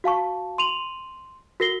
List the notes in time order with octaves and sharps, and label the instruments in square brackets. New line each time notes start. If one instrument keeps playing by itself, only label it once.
[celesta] F#4 F5 A5 C#6
C6 D#7 F7 F#7
F#4 A#4 A#6 C7 G7